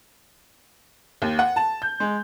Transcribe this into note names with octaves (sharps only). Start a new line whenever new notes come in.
D#2
F#5
A5
G6
G#3